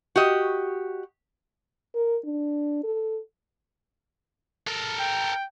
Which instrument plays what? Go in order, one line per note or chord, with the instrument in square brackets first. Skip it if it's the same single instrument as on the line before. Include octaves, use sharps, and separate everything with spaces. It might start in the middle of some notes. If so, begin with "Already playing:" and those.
[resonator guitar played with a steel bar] F#4 G4 D#5
[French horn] A#4
D4
A4
[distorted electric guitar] A4 A#4
[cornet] G5